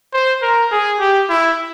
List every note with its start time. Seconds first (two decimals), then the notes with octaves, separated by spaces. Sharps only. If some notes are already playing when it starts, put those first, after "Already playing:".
0.13 C5
0.42 A#4
0.72 G#4
1.01 G4
1.29 E4